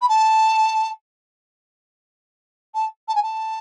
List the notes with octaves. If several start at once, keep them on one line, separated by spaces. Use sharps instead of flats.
B5
A5
A5
A5
G#5
A5